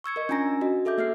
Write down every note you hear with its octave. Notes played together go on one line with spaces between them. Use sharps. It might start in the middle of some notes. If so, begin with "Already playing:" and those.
C#6 E6 G#6 C#7
A#4 D#5
C#4 D4 F4 G#5 A#5 A#6
F#4 D#5
G#4 A4 E5 D6 G6
A#3 E5 F6 C7